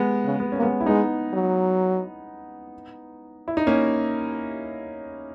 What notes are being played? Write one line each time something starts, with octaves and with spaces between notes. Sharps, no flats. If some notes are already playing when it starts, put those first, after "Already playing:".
Already playing: G#3 B3
C#3
B3
A#3 C#4
G#3 B3
E4
G#3 B3 D#4
F#3
E4
D#4
A#3 C#4